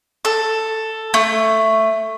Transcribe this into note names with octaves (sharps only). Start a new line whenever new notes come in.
A4
A3